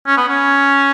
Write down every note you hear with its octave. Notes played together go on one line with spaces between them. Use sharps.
C#4
B3
C#4